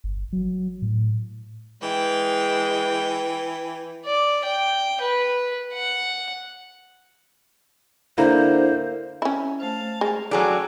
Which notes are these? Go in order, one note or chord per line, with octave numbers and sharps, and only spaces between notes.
G1
F#3
A2
E3 G#3 G5
D5
G5
B4
F#5
D3 A#3 E4 C5
C#4 E4
A3 C5 F5 A5
G#3
F#3 C#4 G#4 A4 D5 G5 A5 A#5